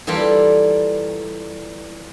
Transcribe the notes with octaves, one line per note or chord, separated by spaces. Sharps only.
E3 G3 A#3 F4 A4 D5